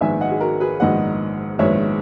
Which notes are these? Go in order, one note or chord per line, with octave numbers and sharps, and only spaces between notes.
A#1 G#2 D#3 G#3 B3 E5 G#5
D#5 F#5
G#4
F#4 A#4
G#4 B4
A#1 G#2 D#3 G#3 B3 D#5 F#5
A#1 G#2 D#3 G#3 B3 C#5 E5